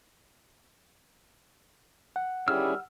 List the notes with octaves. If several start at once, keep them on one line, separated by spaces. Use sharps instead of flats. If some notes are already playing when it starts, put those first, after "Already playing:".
F#5
D3 D#3 G3 C#4 E4 G#4 E6 F6